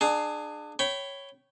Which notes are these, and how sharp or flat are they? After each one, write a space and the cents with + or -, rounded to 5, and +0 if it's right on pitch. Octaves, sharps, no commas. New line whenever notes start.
D4 +30 G#4 +10 F5 +0
C#5 +0 G5 -20 B5 +10